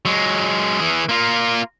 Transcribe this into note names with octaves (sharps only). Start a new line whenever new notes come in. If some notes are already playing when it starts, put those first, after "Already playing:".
F#3 G#3
E3 G#4
A#3 F4